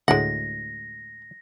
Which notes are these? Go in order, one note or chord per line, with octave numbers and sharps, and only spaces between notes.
D2 A2 G#3 F#5 A#6